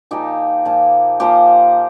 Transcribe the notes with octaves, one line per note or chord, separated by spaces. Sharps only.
A#2 F3 A#3 D#4 G4
A#2 F3 A#3
A#2 F3 A#3 G4 C5